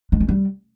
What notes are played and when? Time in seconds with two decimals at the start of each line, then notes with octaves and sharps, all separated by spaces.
0.12 G#3
0.20 C#4
0.29 G3